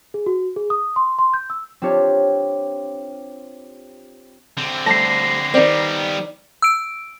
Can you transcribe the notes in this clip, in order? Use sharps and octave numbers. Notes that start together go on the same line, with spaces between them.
G#4
F#4
G#4
D#6
C6
C6
G6
E6
C4 D4 F4 G4 C#5
D3 C4
G3 A3 C5 A5 A#6 C7
D#3 G3 B3 C4 D5
E6 D7